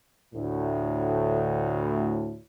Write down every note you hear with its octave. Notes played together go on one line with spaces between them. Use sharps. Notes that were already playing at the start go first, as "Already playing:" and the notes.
D2 A2